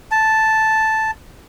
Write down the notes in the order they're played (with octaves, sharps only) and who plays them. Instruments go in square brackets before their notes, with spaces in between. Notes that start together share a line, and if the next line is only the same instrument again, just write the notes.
[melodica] A5